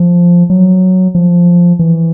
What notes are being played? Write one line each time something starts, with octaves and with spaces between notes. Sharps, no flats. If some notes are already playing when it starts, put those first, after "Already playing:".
Already playing: F3
F#3
F3
E3